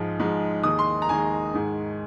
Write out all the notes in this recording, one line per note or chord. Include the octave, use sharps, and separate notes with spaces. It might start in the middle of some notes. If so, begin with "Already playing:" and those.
Already playing: G#2 F3 G#3
G#2 F3 G#3
D#2 D#3 G#3 D#6
C6
A#5
D#2 D#3 G#3 G#5
G#2 D#3 G#3